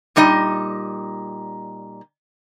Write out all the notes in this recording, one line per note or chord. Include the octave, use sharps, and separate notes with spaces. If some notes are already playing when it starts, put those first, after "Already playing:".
A#2 G3 D#4 D#5